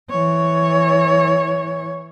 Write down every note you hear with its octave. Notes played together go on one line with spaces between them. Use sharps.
E3 C#5